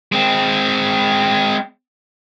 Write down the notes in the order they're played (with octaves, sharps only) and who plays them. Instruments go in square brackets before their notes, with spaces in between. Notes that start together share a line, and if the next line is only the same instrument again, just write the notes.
[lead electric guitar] G#3 C4